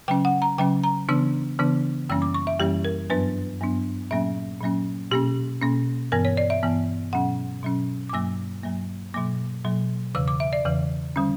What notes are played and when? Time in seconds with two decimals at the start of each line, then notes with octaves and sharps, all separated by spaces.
0.08 C#3 F#3 C#4 G5
0.25 F#5
0.42 A#5
0.58 C#3 F#3 C#4 G5
0.84 A#5
1.09 C#3 E3 B3 D4 E6
1.59 C#3 E3 B3 D4
2.09 F#2 E3 G3 A#3 C#4 E6
2.22 D6
2.34 C#6
2.47 E5
2.60 F#2 E3 G3 A#3 C#4 G4
2.85 A#4
3.10 G2 F#3 B3 D4 B4
3.61 G2 F#3 B3 D4
4.11 A#2 F#3 A#3 C#4 E5
4.61 A#2 F#3 A#3 C#4
5.11 B2 A#3 C#4 G4
5.61 B2 A#3 C#4
6.12 G2 E3 B3 A#4
6.25 C#5
6.37 D5
6.50 E5
6.63 G2 E3 B3
7.13 B2 F#3 C#4 F#5
7.63 B2 F#3 C#4
8.09 D6
8.13 G2 F#3 A#3 E6
8.63 G2 F#3 A#3
9.14 B2 F#3 A#3 D6
9.64 B2 F#3 A#3
10.15 E2 C#3 E3 E6
10.28 D6
10.40 E5
10.53 D5
10.65 E2 C#3 E3
11.16 D3 G3 C#4